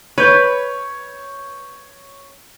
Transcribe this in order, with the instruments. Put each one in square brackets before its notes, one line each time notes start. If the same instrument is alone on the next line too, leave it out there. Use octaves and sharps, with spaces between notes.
[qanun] B4 [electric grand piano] C#5 C#6 G6